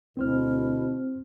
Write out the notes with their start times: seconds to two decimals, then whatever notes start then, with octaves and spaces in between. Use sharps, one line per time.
0.17 D2 B2 C4 E4 C5 F6